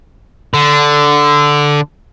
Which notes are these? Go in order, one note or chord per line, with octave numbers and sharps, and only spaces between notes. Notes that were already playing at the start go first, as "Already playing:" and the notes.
D3